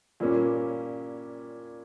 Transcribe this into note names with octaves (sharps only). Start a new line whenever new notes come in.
A#2 G3 A#3 C#4